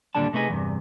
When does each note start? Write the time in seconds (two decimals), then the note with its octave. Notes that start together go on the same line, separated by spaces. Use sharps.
0.15 D#2 A#2 D3 G3 D4 A5
0.33 C3 A3 B3 D#4 G#4
0.49 E2 G2 C3